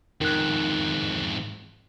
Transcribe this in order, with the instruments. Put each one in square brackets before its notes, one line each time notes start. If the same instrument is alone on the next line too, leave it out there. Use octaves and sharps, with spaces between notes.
[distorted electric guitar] F2 G#2 [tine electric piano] D#3 F#6